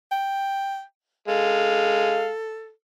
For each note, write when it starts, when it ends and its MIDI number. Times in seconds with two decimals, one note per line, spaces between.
0.11 0.82 79
1.28 2.29 56
1.28 2.70 69
1.28 2.29 77